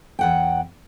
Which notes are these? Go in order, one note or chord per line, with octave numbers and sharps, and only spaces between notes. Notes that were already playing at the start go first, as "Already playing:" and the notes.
E2 F#5 G5